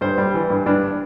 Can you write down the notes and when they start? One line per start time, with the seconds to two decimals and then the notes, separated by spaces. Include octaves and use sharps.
0.01 G2 C5
0.18 G3
0.34 E3
0.50 G2
0.66 G2 D4